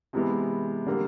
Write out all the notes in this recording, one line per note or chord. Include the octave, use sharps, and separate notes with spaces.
C3 E3 G#3 B3
D3 G3 A#3